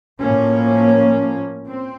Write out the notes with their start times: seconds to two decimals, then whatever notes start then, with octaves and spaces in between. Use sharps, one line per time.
0.20 A2 F3 A#3 C#4
1.68 C4